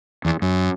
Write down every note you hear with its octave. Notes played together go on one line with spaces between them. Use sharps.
E2
F#2